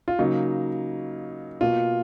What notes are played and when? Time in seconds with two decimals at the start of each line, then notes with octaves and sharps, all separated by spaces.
0.08 F4
0.19 C#3 F#3 A#3 D#4
1.61 B2 A#3 F4